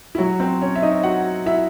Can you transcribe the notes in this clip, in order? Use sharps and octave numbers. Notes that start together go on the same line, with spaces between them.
E4
F#3 F#4
C4 C5
C#4 C#5
E5
D#4 D#5
F#4 F#5
E4 E5